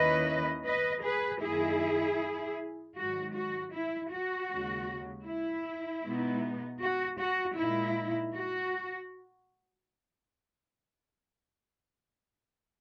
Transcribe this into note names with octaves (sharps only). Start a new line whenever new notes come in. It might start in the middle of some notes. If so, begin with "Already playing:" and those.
Already playing: D#2 D#3 A#3 C#4 E4 B4 D#5
B4 D#5
G#4 B4
F#2 D#3 A#3 D#4 E4 G#4
G#2 D#3 F#3 F#4
F#4
E4
F#4
D#2 C#3 G#3
E4
B2 G#3 B3 D#4
F#4
F#4
A#2 G#3 D#4 E4
F#4